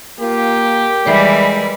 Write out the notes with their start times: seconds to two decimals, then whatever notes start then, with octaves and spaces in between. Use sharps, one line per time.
0.20 A#3 F4 G4
1.05 E3 G3 G#3 A#4 D5